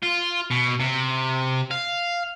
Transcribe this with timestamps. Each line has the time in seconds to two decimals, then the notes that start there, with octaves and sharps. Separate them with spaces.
0.03 F4
0.51 B2
0.80 C3
1.71 F5